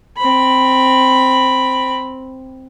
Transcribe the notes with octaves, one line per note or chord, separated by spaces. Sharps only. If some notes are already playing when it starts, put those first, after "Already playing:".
C4 B5